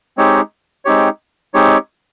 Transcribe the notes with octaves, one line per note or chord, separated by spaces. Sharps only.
G#3 C4 D#4 G4 C#5
G#3 C4 D#4 G4 C#5
G#3 C4 D#4 G4 C#5